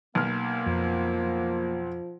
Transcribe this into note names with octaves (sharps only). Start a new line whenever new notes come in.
B1 A#3 F6
F2 F3